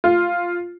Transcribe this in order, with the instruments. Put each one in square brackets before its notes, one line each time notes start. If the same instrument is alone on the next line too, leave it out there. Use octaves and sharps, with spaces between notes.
[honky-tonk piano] F4